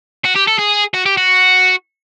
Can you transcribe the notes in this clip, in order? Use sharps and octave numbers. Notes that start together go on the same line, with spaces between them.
F#4
G4
A4
G#4
F#4
G4
F#4